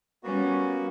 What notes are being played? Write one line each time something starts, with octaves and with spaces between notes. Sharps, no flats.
G3 A#3 B3 C#4 F#4